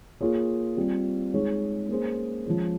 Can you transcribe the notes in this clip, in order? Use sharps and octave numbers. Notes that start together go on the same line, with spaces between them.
A#3 F4 G#4 C#5
G3 C4 F4
G#3 D#4 G#4 C#5
A#3 C#4 G#4 C5
F3 G#3 C#4